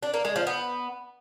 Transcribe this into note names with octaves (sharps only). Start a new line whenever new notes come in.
D4
A#3
G#3
F3
B3